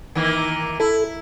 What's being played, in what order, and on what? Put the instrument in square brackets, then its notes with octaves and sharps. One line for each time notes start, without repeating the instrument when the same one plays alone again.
[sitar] D#3 E3 A#3
[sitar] E4 [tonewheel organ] A4